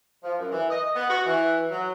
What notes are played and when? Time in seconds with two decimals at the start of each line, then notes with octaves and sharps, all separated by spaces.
0.23 F3
0.39 F#2
0.51 E3
0.71 D#5
0.96 B3
1.09 F#4
1.26 E3
1.71 F#3